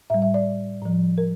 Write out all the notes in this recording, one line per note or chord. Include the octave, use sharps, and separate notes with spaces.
A2 G3 E5
E5
D5
A2 F3
A#4